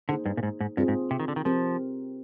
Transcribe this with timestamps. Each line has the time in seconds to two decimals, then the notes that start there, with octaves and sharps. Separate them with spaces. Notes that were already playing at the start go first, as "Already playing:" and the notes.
0.09 D3 A#3 D#4 G#4 C5
0.26 G2
0.37 A#2
0.43 G#2
0.60 G#2
0.77 G2 C4 F4 G#4
0.88 G#2
1.11 C3
1.20 D#3
1.28 D3
1.36 D#3
1.45 F3 C4 G4 A#4